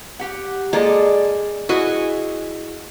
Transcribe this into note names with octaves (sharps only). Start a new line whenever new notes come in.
G4 F#5
G#3 A#3 A4 D5
E4 F#4 G#4 D#5 G#5